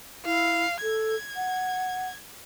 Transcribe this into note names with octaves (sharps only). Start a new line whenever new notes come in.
E4 F5
A4 G#6
F#5